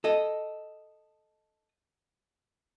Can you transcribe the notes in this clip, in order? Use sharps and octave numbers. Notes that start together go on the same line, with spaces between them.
A4 D#5